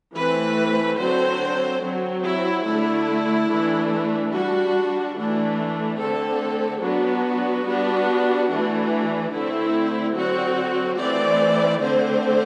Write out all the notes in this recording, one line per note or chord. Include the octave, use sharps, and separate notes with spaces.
E3 A3 C4 B4
D3 F#3 C4 C5
F#3 C4
E4
D3 A3 D4 E4
E3 A3 D4
G3 D4 F#4
E3 A3 D4
D3 A3 C4 A4
F#3 B3 D4 F#4
G3 B3 D4
E3 A3 D4
D3 A3 C4 E4
D3 F#3 C4 F#4
E3 A3 C4 D5
D3 A3 C4 C5